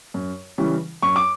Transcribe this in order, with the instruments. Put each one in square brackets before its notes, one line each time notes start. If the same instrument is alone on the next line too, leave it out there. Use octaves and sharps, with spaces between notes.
[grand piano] F#2
C#3 E3 G3 C#4
F#2 C#6
D6